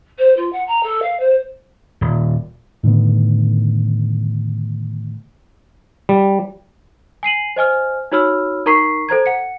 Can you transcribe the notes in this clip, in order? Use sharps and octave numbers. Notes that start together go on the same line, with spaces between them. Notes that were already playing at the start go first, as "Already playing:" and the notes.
C5
F4
F#5
A#5
A4
F5
C5
D#1
A2 D3 D#3 B3
G3
G#5 C7 D#7 F#7
C5 D#5 G#5 F6
D#4 F#4 C#5 B5 E6 F6
D#4 A#4 A#5 C#6 B6 C7
A4 C5 A#5 G#6
F#5 C#7